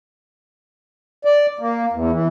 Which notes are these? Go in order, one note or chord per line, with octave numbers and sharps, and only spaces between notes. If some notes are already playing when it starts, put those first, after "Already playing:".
D5
A#3
E2
E3